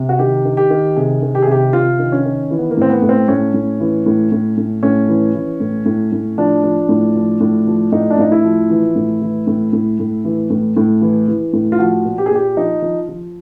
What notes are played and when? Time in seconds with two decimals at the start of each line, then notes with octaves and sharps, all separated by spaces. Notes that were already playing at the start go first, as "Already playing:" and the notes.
Already playing: C3
0.09 F#4
0.19 D#3 G4
0.45 D#3
0.57 G4
0.70 D#3
0.96 C3 G#4
1.22 D#3
1.35 G4
1.42 G#4
1.47 C3 G4
1.73 C3 F4
1.99 D#3
2.12 C#4
2.25 D#3
2.51 E3
2.59 B3
2.71 A#3
2.77 A2 C4
2.89 B3
3.02 A2
3.09 C4
3.28 A2 C#4
3.54 A2
3.80 E3
4.06 A2
4.32 A2
4.57 A2
4.83 A2 C#4
5.09 E3
5.35 E3
5.60 A2
5.86 A2
6.12 A2
6.38 F3 D4
6.64 F3
6.89 A2
7.16 F3
7.40 A2
7.67 F3
7.92 A2 D#4
8.10 D4
8.18 A2 D#4
8.32 E4
8.44 F3
8.70 E3
8.96 A2
9.21 E3
9.47 A2
9.73 A2
9.99 A2
10.25 E3
10.50 A2
10.77 A2
11.01 E3
11.28 E3
11.53 A2
11.72 F4
11.79 F3 F#4
12.05 A#2
12.18 G4
12.26 G#4
12.31 A#2 G4
12.57 F3 D#4
12.82 F3
13.09 F3